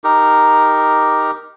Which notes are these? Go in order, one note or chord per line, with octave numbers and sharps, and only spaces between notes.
D#4 G4 A#4